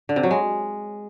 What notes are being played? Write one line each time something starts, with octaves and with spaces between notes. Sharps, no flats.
D3
C3
F#3
G#3